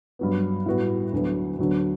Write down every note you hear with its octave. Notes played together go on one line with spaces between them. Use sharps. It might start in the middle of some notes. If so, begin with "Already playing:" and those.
G2 F#3 B3
A2 G3 B3 F#4
D2 D3 F#3 B3
D2 D3 F#3 B3 D4